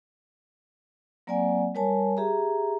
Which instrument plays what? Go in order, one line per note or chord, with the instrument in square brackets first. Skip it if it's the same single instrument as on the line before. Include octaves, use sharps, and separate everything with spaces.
[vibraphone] F#3 A#3 C4 D5 F#5 G#5
G3 A#4 C#5 G#5 A5
G4 G#4 E5 A#5